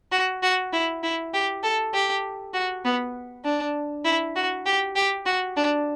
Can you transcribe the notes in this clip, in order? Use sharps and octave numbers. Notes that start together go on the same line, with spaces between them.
F#4
F#4
E4
E4
G4
A4
G4
F#4
B3
D4
E4
F#4
G4
G4
F#4
D4